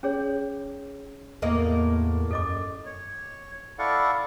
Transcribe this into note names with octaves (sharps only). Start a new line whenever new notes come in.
C#4 G#4 C#5
E2 A2 A#3 D#5
F#2 A4 D#5 D6
C#5
E4 A4 D5 F5 F#5 C#6